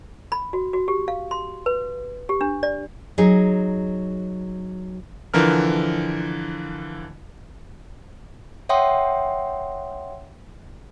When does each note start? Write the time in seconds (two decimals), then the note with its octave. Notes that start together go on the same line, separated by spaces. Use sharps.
0.32 B5
0.53 F#4
0.73 F#4
0.88 G4
1.08 F5
1.31 C6
1.66 B4
2.29 G4
2.41 D4
2.63 D5
3.18 F#3 D#4 G#4
5.34 D3 E3 F3 A#4 F6
8.69 C#5 E5 F#5 G5 C6 D#6